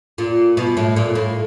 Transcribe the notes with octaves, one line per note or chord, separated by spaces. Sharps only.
A#2
B2
A2
A#2
A2